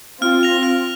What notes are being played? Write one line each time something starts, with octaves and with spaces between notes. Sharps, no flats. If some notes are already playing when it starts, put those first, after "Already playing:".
C4 F4 F6
A#6 F7
F6